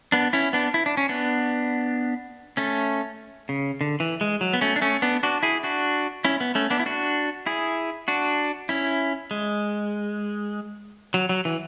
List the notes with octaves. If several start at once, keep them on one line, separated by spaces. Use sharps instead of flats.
B3 D4
C#4 E4
B3 D4
E4
D4
C#4
B3 D4
A3 C#4
C#3
D3
E3
G#3
F#3
B3
A3 C#4
D4
A3 C#4
B3 D4
D4 F#4
E4 G#4
D4 F#4
C#4 E4
B3
A3 C#4
B3 D4
E4
D4 F#4
E4 G#4
D4 F#4
C#4 E4
G#3
F#3
F#3
E3